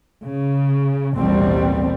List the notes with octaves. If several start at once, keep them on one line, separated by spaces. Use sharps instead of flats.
C#3
A1 D#2 B2 G3 C4